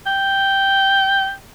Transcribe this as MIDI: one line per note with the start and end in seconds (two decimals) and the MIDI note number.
0.06 1.32 79